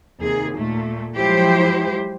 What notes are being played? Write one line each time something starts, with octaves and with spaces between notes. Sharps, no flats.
D#2 C3 G#4
A#2 A3
F3 F#3 G#3 E4 G4 C5